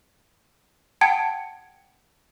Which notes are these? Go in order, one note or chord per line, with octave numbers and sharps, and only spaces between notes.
F#5 G5 A5 G#6 C#7 D7